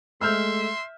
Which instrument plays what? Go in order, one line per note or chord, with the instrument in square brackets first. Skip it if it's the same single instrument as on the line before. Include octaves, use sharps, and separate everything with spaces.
[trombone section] G#3 A3 [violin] E5 [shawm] C6 [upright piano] E6 F6 G6